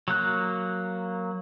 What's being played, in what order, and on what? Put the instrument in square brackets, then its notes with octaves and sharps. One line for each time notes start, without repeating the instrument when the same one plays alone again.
[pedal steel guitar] F#3 A#3 F#6